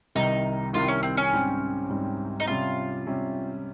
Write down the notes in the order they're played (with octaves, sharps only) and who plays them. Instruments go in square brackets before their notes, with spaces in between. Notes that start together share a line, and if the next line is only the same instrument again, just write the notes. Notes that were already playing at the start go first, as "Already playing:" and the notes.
[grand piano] C2 C3 D#3 G3 [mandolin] D#4
[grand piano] C2 C3 D#3 G3 [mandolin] F4
[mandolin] C#4
C4
C#4
[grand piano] G#2 G3 C4
G#2 G3 C4
[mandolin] D#4
[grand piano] C3 G3 C#4 [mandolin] F4
[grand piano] C3 G3 C#4